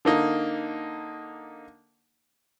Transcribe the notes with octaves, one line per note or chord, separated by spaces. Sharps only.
D3 A#3 D#4